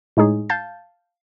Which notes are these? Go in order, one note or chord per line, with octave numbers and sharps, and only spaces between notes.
A2 G#3 D#4 G#4 C#5
F5 A5 G6 A6 C7